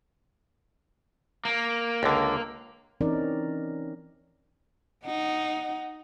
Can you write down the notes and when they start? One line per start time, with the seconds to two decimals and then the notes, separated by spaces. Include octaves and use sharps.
1.45 A#3
2.03 C#2 D3
3.01 E3 C4 C#4 D#4 A#4 D5
5.06 D#4 F#5